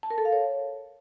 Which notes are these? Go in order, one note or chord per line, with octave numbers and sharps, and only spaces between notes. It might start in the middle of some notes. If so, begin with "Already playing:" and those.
A5
A#4
A4
F5
C#5